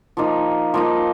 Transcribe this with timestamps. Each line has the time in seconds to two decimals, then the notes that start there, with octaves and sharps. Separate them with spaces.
0.17 F3 A#3 D#4
0.74 F3 A#3 D#4